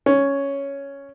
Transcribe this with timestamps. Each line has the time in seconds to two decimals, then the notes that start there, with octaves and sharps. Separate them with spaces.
0.06 C#4